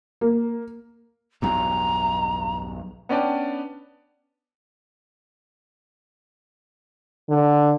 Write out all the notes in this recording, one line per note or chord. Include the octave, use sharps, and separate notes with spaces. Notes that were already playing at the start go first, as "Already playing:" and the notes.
A#3
B1 E2 G2 A#5
B3 C#4 D4 D5 G5 A5
D3